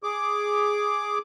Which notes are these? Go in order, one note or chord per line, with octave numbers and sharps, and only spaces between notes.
G#4 D6